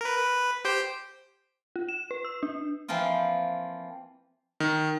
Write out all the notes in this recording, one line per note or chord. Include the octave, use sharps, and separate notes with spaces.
A#4 B4
B4
G4 C5 G5
F4
E7
B4
E6
D4
E3 F3 A#3 C4 F4
D#3